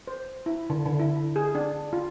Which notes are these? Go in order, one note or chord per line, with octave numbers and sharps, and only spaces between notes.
C5
E4
D3
D3
E4
G#4
D4
F4